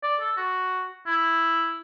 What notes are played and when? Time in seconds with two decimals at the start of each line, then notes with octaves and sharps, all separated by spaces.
0.03 D5
0.20 A4
0.37 F#4
1.07 E4